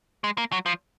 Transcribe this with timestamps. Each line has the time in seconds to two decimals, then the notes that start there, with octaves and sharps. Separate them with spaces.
0.24 G#3
0.38 A#3
0.52 F#3
0.66 F3